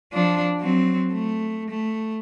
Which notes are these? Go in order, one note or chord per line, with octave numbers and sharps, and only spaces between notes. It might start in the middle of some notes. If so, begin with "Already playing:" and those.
F3 D4
F#3 C4
A3
A3